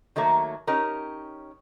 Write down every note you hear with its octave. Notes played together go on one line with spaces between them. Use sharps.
D#3 F#3 A3 A#3
C#4 D#4 G4 A#4